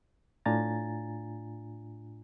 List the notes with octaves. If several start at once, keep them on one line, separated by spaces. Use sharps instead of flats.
A2 D4 F4 G#5 A#5 A6